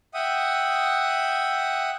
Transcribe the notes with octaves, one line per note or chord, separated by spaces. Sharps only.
E5 F#5 G5 D#6